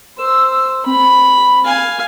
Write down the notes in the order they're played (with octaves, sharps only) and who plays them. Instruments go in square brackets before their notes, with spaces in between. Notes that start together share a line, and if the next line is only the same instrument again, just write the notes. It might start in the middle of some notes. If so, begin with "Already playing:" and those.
[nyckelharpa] C5 [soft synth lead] E6
[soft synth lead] C4 [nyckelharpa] B5
[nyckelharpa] F5 G#5